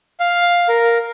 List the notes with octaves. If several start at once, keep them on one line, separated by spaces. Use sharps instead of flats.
F5
A#4